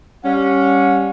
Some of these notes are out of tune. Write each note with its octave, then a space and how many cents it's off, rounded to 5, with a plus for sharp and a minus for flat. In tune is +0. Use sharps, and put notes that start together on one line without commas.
G3 +0 C#4 +0 F#5 -40